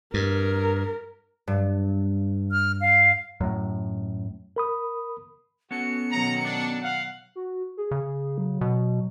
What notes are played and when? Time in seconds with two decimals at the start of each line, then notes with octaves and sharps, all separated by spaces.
0.14 G2 A#4
1.47 G2
2.52 F6
2.81 F5
3.41 F#2 A2
4.56 A#4 B5 D#6
5.71 B3 C#4 F#4 A4 C#7
6.11 B2 D#3 F#3 A#5
6.44 D4
6.83 F5 F#5
7.36 F#4
7.77 G#4
7.91 C#3
8.38 F#3
8.61 B2